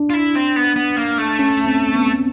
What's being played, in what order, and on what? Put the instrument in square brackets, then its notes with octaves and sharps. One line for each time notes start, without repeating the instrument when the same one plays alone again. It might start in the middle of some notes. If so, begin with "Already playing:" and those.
Already playing: [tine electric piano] D4
[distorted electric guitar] F4
E4
C4
B3
B3
A#3
A3
[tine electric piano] C#4
C4
B3